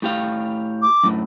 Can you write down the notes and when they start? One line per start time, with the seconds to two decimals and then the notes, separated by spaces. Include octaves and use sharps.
0.02 A2 G4 F5
0.82 D6
1.03 F#2 A2